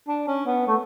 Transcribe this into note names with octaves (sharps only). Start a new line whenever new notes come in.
D4
C#4
B3
A3